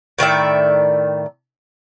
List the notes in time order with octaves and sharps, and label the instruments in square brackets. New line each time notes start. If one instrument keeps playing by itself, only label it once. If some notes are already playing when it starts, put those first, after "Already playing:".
[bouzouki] A2 D#3 D5 E5